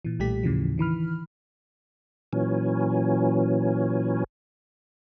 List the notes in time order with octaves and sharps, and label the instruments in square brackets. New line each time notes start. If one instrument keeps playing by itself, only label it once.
[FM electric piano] A#2 E3
B1 A#2 G3 A3 G4 B6
D#2 A2 C#3 E3 F3
D#3 E3 B5 F6
[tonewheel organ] A#2 E3 F#3 C#4